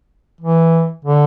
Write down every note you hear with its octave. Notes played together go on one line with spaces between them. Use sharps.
E3
D3